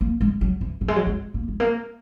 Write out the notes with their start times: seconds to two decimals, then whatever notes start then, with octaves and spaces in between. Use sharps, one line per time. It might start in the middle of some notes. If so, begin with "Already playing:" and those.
0.01 A#3
0.21 G#3
0.41 F#3
0.61 E3
0.81 F#3
0.88 G#3
0.96 F#3
1.07 G#3
1.34 A#3
1.48 G#3
1.60 A#3